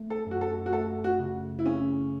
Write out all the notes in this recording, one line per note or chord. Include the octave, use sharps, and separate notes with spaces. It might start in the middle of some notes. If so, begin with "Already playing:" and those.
Already playing: A3
A4
F#2 F#4
A4
F#4
A3 A4
F#4
C#3
E4
C#3 C#4